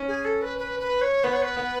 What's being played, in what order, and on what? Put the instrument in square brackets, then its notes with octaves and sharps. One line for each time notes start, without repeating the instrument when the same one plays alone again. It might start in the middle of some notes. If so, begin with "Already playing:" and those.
Already playing: [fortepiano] C#4
[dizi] G#4
A4
B4
B4
B4
C#5
[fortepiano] B3 [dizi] B4
[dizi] C#5
B4
[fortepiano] B3